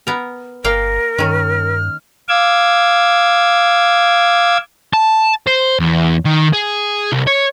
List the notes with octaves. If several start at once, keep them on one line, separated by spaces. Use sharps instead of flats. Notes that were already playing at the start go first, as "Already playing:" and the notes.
B3 A#4
G1 A#3 A#4 F5 G5
G2 D#3 C#4 F6
F5 D6 E6 G#6
A5
C5
E2
D#3
G#4
C2
C#5